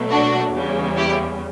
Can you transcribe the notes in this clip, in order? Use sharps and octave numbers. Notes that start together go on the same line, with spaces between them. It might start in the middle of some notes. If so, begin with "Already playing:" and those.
Already playing: B2 F#3 A3
D4 F#4
E2 C#3 G3
E4 G4